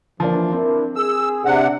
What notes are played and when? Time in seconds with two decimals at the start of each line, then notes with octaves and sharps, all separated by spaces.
0.20 E3 F3 A#3 D4
0.52 C4 D4 E4 A#4
0.96 G#4 E6
1.45 C3 D4 D5 F#5